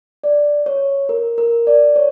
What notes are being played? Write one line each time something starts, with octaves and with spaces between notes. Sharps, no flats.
D5
C#5
A#4
A#4
D5
C#5